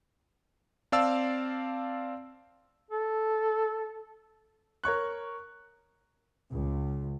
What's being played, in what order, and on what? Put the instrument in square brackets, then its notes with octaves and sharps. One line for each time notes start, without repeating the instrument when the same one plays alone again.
[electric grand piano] C4 D5 F5 A5 E6
[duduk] A4
[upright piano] A#4 C#5 C#6 F#6
[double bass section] C#2